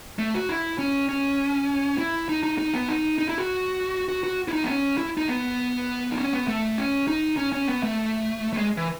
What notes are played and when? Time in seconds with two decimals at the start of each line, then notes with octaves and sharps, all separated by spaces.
0.19 A3
0.34 F#4
0.49 E4
0.79 C#4
1.09 C#4
1.98 E4
2.29 D#4
2.43 D#4
2.58 D#4
2.73 B3
2.88 D#4
3.19 D#4
3.29 E4
3.38 F#4
4.09 F#4
4.24 F#4
4.48 E4
4.53 D#4
4.63 B3
4.68 C#4
4.98 E4
5.18 D#4
5.28 B3
6.11 D#4
6.18 C#4
6.33 B3
6.48 A3
6.78 C#4
7.08 D#4
7.37 C#4
7.53 C#4
7.68 B3
7.83 A3
8.53 A3
8.57 G#3
8.77 E3